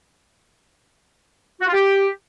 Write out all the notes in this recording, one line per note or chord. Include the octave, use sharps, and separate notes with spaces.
F#4
F4
G4